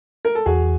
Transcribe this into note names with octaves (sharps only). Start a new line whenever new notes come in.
A#4
A4
E2 F#4 G#4